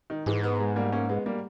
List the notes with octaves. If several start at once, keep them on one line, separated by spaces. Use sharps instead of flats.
D#3
G#2 E3 G#3
G#3 B3
G#3 B3
G3 A#3
A#3 C#4
G#3 B3
G3 A#3